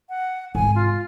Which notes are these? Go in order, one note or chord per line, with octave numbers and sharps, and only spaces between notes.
F#5
G#2 C3 G#5
F4